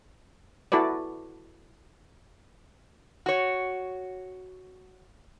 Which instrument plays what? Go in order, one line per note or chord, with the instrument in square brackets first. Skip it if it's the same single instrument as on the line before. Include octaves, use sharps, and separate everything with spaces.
[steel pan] E4 F#4 A4 B4 D5
[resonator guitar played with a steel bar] F#4 C#5